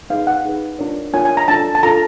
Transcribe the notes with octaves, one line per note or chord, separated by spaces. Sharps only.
D#4 G#4 B4 F5
F#5
D#4 G#4 B4
D4 F4 A#4 C#5
D4 F4 A#4 C#5 G#5
G#5
A#5
D4 F4 A4 A5
A5
D4 F4 A4 A#5